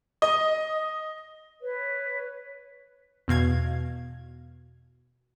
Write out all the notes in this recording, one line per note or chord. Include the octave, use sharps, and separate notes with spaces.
D#5
B4 C#5
E2 B2 F5 G#6